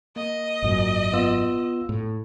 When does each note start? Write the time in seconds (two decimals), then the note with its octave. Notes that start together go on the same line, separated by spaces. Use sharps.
0.16 A#3 D#5
0.62 G#1 F#2 A#2
1.13 B3 F4 E6
1.89 A2